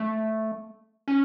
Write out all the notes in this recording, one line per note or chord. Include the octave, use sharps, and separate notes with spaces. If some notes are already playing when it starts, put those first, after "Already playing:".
Already playing: A3
C#4